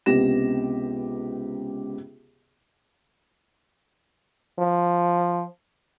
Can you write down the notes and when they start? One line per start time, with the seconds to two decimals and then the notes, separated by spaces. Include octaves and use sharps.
0.06 C#2 C3 B3 G4 A#6 E7
4.59 F3